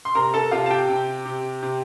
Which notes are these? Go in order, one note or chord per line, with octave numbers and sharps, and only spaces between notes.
C6
C3 A#4 A#5
A4 A5
C3 F4 F5
A5
G4 G5
C3
C3
C3